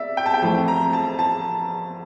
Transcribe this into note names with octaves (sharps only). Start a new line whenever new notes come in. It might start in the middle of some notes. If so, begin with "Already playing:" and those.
Already playing: D5 E5
G5
A5
G5
F2 E3 A3
A#5
A5
A5